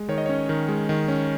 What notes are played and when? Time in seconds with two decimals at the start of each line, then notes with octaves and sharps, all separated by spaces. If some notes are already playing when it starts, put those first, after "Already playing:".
Already playing: G#3
0.09 D#3 C#5
0.18 D#5
0.26 C#4 C#5
0.49 D#3
0.68 G#3
0.89 D#3
1.08 C#4